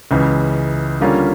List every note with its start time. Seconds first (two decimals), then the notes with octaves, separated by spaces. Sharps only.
0.11 C#2 C#3 E3
1.01 D3 G3 A#3 C#4 F4